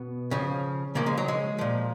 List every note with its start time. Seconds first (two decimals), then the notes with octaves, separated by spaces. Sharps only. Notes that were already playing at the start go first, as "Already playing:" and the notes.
Already playing: B2 B3
0.31 C#3 F3
0.95 C#3 F3 A#3
1.06 G#3
1.18 F#3
1.28 G#3
1.59 A#2 F3